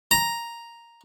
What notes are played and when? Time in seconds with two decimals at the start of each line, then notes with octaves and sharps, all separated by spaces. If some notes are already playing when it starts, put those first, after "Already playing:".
0.11 A#5